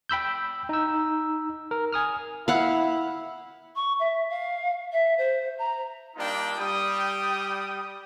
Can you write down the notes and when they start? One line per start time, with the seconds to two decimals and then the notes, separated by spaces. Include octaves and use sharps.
0.09 G5 B5 E6 G6
0.69 D#4 E6
1.71 A#4
1.92 G#5 D#6 F6
2.48 E4 F5 F#5
3.76 C#6
3.99 E5
4.30 F5
4.92 E5
5.18 C5
5.58 A#5
6.16 G3 A#3 D4 D#4 F4 G5
6.58 G3 G5 D#6